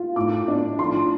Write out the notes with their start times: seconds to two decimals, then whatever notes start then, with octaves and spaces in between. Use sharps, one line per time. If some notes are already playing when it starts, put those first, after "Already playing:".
Already playing: F4
0.16 A2 D6
0.48 D4
0.79 F3 C6